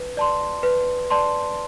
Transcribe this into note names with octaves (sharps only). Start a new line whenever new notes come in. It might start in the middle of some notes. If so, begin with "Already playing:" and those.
Already playing: B4
D5 A5 C6
B4
D5 A5 C6